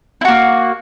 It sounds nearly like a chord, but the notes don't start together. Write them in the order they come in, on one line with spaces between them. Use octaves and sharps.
E4 F#4 A#3